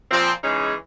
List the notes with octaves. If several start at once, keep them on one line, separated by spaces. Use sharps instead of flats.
A#2 F3 C4
C#3 E3 G#3 C#4 D#4 G#4